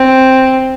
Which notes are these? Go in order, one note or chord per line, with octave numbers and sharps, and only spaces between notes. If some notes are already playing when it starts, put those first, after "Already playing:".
Already playing: C4